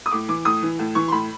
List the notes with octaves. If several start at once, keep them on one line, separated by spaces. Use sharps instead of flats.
D#6
A2 D6
E3 D6
A2 D#6
E3
A2
E3 C#6
C6
A2 B5